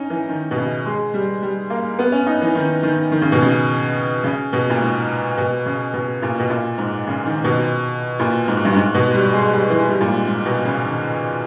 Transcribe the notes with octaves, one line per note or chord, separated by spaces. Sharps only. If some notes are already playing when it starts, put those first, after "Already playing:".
Already playing: C#4 D#4
E3
D#3
B2
C#3
G#3
G3
G3
A#3
B3
C#4
D#4
E3
D#3
D#3
D#3
C#3
B2
C#3
C#3
B2
A#2
G#2
B2
C#3
B2
A#2
B2
A#2
G#2
C#3
D#3
B2
A#2
G#2
G2
G#2
B2
G3
G#3
G3
E3
G3
A#2
G#2
G#2
B2
C#3
D#3